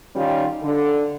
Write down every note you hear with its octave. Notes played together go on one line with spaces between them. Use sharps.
D#3 G3 C#4 F4
D3